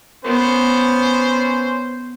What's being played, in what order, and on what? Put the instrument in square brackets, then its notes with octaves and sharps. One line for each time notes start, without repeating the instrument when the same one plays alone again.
[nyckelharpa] B3 [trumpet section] C#4 C5